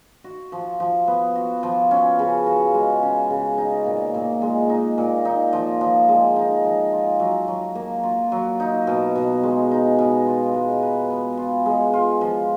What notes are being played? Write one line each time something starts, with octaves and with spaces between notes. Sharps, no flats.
F#4
F3
F3
B3
F#4
F3
C#4
C#3
F#4
G#3
C#4
C#3
D#4
A#2
A#2
G#3
D#4
A#2
D#4
F3
F3
G#3
D#4
F3
F4
F#3
F#3
A#3
F4
F#3
D#4
B2
B2
G#3
D#4
B2
F4
G#3
B4
B3
F4
G#3
F4
F3